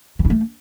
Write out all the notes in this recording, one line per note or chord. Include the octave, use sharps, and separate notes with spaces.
E3
E4
A3